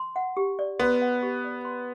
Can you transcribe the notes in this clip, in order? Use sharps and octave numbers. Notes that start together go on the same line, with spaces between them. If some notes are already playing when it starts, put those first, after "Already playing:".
Already playing: C6
F#5
G4
D5
B3 C6
F#5
G4
D5
C6